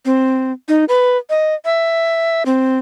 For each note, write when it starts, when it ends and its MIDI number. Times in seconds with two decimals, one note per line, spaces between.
0.05 0.52 60
0.69 0.85 63
0.89 1.17 71
1.30 1.55 75
1.65 2.43 76
2.46 2.79 60